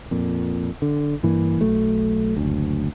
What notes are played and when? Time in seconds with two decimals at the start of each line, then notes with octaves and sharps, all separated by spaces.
0.11 F2 A#2
0.82 D3
1.23 G2 E3 A#3
1.61 B1 F#3 A3
2.37 F#1 D2